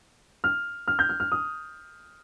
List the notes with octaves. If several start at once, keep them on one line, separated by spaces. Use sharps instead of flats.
F6
F6
G6
F6
F6
D#6